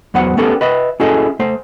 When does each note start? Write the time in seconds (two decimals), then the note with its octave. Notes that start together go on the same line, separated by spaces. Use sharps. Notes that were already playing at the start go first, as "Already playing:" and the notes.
0.14 E2 F#3 B3 C5 F#5
0.37 A3 B3 C#4 G4 A4 A#4
0.61 B4 D#5 E5
1.00 C#4 E4 F#4 G#4 A4 D#5
1.39 A3 C5